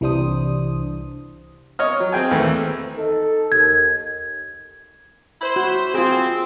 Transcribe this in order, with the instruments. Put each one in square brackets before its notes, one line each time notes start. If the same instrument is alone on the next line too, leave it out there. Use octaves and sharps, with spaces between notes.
[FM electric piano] C2 E3 G3 D4 C5 D#6
[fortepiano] C#5 D#5 F6
F#3
C4 G#4 G5 G#5
D#2 E3 A3 C4
[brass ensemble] D#4 A4
[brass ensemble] D#2 [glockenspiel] G#6
[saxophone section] E4 C5
[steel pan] F#4
[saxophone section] C4 [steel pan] F4 G#4